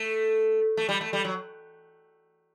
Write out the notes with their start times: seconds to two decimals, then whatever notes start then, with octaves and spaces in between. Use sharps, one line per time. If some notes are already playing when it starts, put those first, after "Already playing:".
Already playing: A3
0.77 A3
0.89 G3
1.01 A3
1.13 G3
1.24 F#3